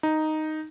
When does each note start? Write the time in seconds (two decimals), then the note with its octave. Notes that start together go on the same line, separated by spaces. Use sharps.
0.03 D#4